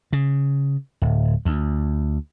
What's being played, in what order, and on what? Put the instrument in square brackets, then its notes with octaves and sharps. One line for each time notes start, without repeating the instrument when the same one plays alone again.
[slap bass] C#3
D1
D2